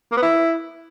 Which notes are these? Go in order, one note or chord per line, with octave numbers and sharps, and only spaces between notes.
A#3
B3
E4